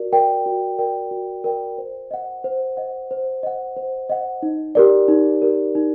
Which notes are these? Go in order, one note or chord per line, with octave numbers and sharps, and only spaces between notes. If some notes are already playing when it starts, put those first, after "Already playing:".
Already playing: F#4 A#4 D5
A#4 D5 G5
F#4
A#4 D5 G5
F#4
A#4 D5 G5
C5
D#5 F#5
C5
D#5 F#5
C5
D#5 F#5
C5
D#5 F#5
D#4
G4 A#4 D5
D#4
G4 A#4 D5
D#4